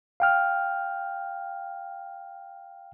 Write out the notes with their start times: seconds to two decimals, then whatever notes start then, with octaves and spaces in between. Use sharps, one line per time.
0.20 F5 G5 F6